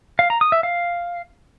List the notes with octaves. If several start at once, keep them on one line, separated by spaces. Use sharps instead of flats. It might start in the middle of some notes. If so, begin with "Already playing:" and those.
F5
A#5
D#6
E5
F5